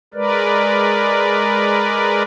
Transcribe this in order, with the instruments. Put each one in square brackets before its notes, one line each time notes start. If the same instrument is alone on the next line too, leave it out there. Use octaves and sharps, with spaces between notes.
[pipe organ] G#3 A#4 B4 D5